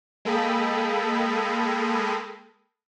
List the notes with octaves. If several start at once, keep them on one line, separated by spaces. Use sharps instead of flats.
G#3 A#3 A4 G5 B5 D#6